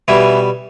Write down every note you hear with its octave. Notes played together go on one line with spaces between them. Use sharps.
B2 E3 G3 E4